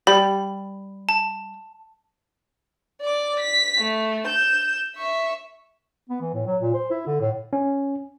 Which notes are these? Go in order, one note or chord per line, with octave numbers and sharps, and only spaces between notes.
G3 B5
A5
D5 D6
B6
A3
G6 E7
E5 C#6
B3
E3
A2
F#3
A#2
C5
E4
D3
A2
C#4